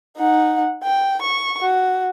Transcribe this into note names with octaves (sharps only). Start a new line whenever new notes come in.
D#4 F#5
G5
C#6
F#4